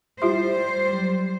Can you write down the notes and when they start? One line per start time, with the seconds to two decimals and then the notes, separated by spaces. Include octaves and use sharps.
0.22 G3 E4 F4 G4 C5 E5 C6
0.93 F#3